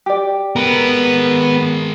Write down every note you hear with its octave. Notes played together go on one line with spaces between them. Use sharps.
G4 D5
G#3 B3 A#4